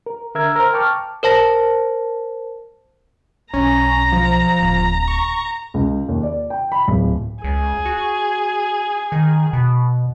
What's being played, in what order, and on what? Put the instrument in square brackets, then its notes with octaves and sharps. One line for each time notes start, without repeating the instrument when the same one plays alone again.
[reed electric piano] A#4
D3 A#4 E5 E6 G#6
A#4 C5
G5 A5 C#6 D6 F6
[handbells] A#4 C5 A5 A#6
[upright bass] B1 [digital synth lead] C#4 [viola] A#5
[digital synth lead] F3
[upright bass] D1
[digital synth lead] C#6
[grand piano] C#2
D#2
D5
G5
B5
D1
[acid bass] C#2 [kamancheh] G#4
[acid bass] F#4
D#3
B2